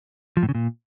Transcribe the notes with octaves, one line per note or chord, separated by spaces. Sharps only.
F3
A2
C#3
A#2